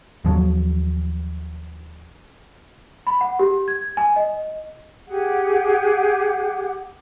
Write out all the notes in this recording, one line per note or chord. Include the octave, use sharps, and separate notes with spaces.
D#2 F3 F#3
B5
F#5
G4
G#6
G#5
D#5
G4 G#4 F#5